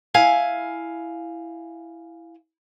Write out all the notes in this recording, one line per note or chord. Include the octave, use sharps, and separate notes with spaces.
E4 F5 G#5